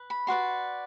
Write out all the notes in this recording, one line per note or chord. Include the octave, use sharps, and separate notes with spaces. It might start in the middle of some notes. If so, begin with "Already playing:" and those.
Already playing: B4
B5
F#4 B4 D5 C6